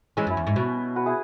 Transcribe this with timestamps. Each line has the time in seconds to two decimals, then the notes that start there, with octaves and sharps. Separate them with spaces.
0.17 E3 G#3 C#4
0.27 F#2
0.30 E4
0.37 E2
0.47 G#2
0.56 B2
0.96 F#4 B4
1.06 E4 G#4